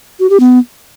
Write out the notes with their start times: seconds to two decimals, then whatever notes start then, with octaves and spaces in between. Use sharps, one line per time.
0.20 F#4
0.30 G4
0.40 B3